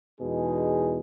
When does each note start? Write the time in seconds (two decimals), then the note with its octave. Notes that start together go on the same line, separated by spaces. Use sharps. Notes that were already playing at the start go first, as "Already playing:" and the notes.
0.21 E2 B2 G#3 D#4 G#4